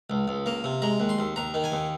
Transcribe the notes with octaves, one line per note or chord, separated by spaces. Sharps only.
C#2
C#2
A#3
C3
G#3 A#5
D#2
C6
D#2
D#2 A#5
D#3
G#5
D#2